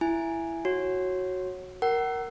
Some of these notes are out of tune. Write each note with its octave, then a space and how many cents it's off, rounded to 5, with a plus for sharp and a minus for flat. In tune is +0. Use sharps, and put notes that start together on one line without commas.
E4 +15 G#5 -5
F#4 +0 C#5 -15
A#4 +0 F#5 +35